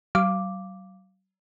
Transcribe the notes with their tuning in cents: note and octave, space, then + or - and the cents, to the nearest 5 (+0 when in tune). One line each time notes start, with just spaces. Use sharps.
F#3 +45 F5 -10 D6 +0